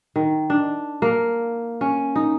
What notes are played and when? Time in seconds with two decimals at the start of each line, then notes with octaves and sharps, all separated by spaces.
0.16 D#3
0.50 D4
1.02 A#3
1.81 C#4
2.16 D#4